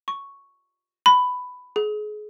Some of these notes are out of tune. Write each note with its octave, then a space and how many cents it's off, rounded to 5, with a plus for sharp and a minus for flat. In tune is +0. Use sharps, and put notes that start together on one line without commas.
C#6 +0
B5 +10
G#4 +30